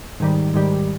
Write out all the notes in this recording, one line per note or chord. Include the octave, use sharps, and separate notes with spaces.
G#2 D#3 G3
G#2 D#3 G3